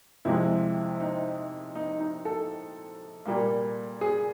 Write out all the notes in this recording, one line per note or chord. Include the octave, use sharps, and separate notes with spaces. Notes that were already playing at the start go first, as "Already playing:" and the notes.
F2 C3 F3 G#3 E4
D#4
D#4
D#4
A4
A#2 G3 A#3
G#4